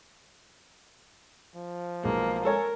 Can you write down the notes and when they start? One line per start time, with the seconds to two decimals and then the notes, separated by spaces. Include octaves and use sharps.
1.56 F3
2.03 B1 G#3 A#3
2.45 A4 A#4 C#5 G#5